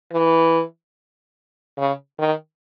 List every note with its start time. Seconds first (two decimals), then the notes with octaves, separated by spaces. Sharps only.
0.12 E3
1.78 C#3
2.19 D#3